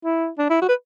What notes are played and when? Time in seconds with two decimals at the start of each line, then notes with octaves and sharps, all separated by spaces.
0.05 E4
0.38 D4
0.50 E4
0.62 F#4
0.69 B4